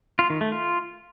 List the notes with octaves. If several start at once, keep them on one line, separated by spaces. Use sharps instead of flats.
F4
D#3
A3
F4